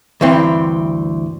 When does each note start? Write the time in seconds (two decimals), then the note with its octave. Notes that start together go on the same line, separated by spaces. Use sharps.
0.21 D2 G2 E3 C4